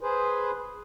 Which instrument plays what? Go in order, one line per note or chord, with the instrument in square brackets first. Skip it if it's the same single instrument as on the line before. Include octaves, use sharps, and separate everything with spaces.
[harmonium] G#4 B4 C5